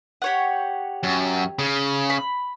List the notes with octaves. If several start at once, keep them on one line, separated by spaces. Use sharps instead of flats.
G4 C#5 F#5
F#2
C#3
B5